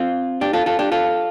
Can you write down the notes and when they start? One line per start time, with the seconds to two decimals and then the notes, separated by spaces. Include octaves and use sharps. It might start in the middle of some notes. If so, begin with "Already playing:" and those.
Already playing: C4 F4
0.41 D4 G4
0.53 F4 A4
0.66 F4 A4
0.79 D4 G4
0.92 F4 A4